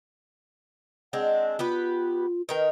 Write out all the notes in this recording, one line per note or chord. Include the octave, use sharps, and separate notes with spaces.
G#3 C4 D4 F#5
B3 F4 G4 B4
D#3 A#4 B4 G5